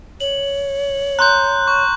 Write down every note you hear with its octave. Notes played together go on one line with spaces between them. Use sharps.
C#5 F#7
A#5 C6 F#6 G6
C#6